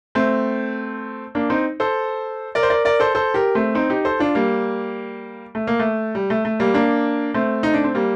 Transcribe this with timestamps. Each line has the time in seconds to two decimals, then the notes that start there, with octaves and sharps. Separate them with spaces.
0.15 A3 C4
1.35 A#3 D4
1.50 C4 D#4
1.80 A4 C5
2.55 A#4 D5
2.63 C5
2.70 A#4 D5
2.85 A#4 D5
3.00 A4 C5
3.15 A4 C5
3.34 G4 A#4
3.55 A3 C4
3.75 C4 D#4
3.90 D#4 G4
4.05 A4 C5
4.20 D4 F4
4.35 G3 A#3
5.55 A3
5.67 A#3
5.80 A3
6.15 G3
6.30 A3
6.45 A3
6.60 G3 A#3
6.74 A#3 D4
7.34 A3 C4
7.63 D#4
7.74 D4
7.84 C4
7.95 G3 A#3